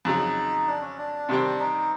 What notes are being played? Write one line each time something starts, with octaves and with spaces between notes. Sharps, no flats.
F2 C#3 F#3 D#4
D4
C#4
D4
C3 D#3 G3 C4
D#4